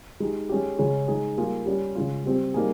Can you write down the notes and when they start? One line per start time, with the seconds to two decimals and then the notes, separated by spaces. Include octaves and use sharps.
0.20 G#3 D#4 G4
0.49 G#3 C#4 G4
0.79 C#3 G#3 C#4 G#4
1.08 G#3 D#4 G#4
1.37 G3 A#3 F4 G#4
1.66 G3 C#4 G4
1.95 C#3 G#3 C#4 F4
2.25 G3 C4 G4
2.54 G3 A#3 D#4 G#4